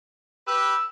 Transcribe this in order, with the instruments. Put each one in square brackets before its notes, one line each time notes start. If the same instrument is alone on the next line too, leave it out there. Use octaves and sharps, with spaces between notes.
[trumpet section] G4 B4 [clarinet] E6